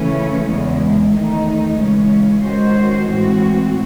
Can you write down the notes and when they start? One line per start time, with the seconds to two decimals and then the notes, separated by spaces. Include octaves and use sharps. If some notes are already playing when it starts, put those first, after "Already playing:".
Already playing: C#3 E3 A3 C#4
0.46 E2 C#3 G#3
1.11 E2 D#3 A3 D#4
1.76 C#3 E3 G#3 C#4
2.41 D#3 G#3 C#4 F#4 C5
3.06 A2 E3 G#3 C4 F#4